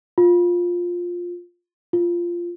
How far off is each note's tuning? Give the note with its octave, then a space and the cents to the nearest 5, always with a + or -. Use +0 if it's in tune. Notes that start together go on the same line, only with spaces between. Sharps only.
F4 +10
F4 -10